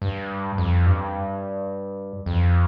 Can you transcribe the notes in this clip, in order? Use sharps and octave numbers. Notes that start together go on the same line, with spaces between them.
G2
F2
G2
F2